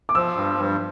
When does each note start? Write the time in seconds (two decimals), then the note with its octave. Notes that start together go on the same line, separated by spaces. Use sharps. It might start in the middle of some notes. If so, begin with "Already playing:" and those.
0.09 D6
0.15 F3 E6
0.37 G2
0.58 G2